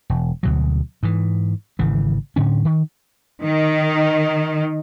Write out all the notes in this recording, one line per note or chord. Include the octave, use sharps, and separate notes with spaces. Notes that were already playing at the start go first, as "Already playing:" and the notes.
E1
D2 B2 F#3
G#2 E3
G#1 C#3 E3
A2 D3 C#4
D#3
D#3